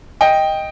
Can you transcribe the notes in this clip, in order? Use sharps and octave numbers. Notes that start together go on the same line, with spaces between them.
D#5 G5